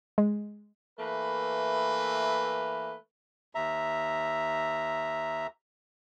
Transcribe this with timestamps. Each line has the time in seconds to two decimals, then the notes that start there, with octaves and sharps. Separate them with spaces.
0.18 G#3
0.99 E3 A3 A#3 B4
3.55 D#2 E5 A#5